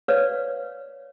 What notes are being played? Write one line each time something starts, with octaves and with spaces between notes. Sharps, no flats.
B4 C#5 D5 F5